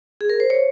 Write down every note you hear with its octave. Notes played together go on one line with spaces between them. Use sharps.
G#4
A#4
C5
C#5